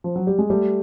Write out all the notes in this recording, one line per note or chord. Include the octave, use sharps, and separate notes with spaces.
F3
F#3
G3
G#3
G3 A3